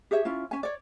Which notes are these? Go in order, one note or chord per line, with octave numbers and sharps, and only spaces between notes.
G4 G#4 C#5 E5
C#4 E4 F4
C#4 G#5
C#5 D5